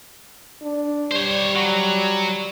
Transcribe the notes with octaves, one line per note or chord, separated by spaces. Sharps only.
D4
G3 C5 C#5
F#3